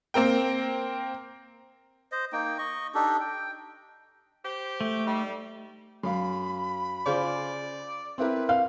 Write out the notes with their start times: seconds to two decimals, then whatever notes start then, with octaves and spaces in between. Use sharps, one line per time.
0.14 A#3 C4 A#4 G5
2.12 C5 D#5
2.33 A#3 D#4 G5
2.58 D#5 C#6
2.95 D4 D#4 G4 A4
3.20 G5
4.44 G4 C5
4.81 A3
5.06 G3 D#4
6.03 F#2 F5 B5
7.06 C#3 F4 C5 D5
8.18 C4 E4 A#4 B4
8.49 F5